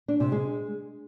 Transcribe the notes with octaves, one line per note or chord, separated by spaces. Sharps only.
D4
C3
G#3